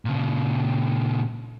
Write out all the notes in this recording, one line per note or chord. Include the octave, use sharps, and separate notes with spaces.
A#2 C#3